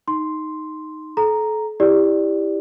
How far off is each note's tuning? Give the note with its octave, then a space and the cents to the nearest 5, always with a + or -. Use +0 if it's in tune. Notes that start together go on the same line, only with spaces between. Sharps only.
D#4 +0 C6 +0
A4 -35 A#5 +0
E4 +0 G4 +15 D5 +0